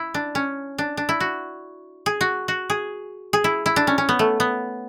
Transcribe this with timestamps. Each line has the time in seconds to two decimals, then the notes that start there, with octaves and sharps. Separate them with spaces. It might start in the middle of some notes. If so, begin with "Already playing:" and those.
Already playing: E4
0.14 D4
0.35 C#4
0.78 D4
0.97 D4
1.09 E4
1.20 F#4
2.06 G#4
2.21 F#4
2.48 F#4
2.70 G#4
3.33 G#4
3.44 E4
3.66 E4
3.76 D4
3.87 C#4
3.98 C#4
4.09 B3
4.19 A3
4.40 B3